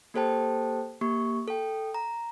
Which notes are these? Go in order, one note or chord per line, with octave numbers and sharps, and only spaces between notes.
A#3 G4 A4 C5 G5 A5
A#3 G4 C#6
A4 G5
A#5